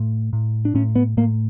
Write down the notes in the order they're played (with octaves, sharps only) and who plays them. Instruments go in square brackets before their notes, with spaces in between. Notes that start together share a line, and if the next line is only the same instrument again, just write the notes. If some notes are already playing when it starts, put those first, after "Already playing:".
Already playing: [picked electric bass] A2
A2
D4
A2 C#4
B3
A2 A#3